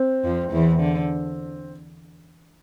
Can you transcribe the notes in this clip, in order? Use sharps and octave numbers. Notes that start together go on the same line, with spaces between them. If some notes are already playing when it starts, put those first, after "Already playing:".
Already playing: C4
F2 F3
E2 E3
D3